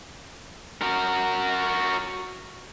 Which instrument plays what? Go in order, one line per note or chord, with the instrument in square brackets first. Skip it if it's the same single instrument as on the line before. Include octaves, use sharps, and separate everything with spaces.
[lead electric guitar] F#4 A#4